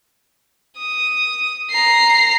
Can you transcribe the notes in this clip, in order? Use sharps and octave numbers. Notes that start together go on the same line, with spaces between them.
D#6
A#5 C7